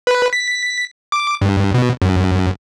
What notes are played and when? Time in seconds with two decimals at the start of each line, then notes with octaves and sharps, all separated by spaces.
0.07 B4
0.33 B6
1.12 D6
1.42 G2
1.74 B2
2.02 F#2